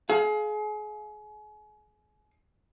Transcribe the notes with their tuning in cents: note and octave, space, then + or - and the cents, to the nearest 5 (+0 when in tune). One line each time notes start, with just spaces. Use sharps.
G#4 +35 F5 +0